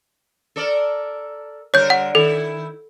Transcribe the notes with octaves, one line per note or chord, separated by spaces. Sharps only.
A4 A#4 D5
D3 G3 A#4 C#5 G6
F#5
D#3 E4 A4